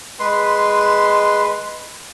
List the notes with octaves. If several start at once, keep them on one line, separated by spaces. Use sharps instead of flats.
G#3 B4 C6